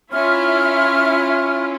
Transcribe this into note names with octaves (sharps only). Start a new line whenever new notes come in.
C#4 E4 F4 E5 F6